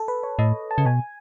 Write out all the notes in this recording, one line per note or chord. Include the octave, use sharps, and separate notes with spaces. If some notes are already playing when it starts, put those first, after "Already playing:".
Already playing: A4
B4
C#5
A2 D#5
A5
C#3
B2 G#5